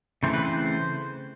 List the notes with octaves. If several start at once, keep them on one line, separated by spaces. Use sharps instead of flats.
C#3 E3 A3 C4 C5
B4
C5